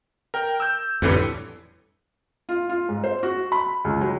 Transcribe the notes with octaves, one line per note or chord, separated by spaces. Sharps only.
A#4 G5
E6 G6
F2 A2 D3 E3 G3
F4
F4
G#2
C5
F#4
B5
C#2
F#3